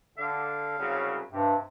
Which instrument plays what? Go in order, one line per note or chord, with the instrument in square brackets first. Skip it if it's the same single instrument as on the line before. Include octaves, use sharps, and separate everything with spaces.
[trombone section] D3 [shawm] F5
[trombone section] C2 C#3 F#3
[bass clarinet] G2 [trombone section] C3